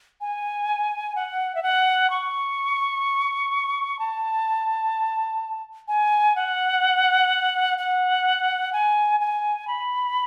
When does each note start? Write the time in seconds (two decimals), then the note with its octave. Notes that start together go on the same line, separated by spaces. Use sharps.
0.21 G#5
1.15 F#5
1.55 E5
1.63 F#5
2.10 C#6
3.99 A5
5.88 G#5
6.36 F#5
7.78 F#5
8.73 G#5
9.20 G#5
9.67 B5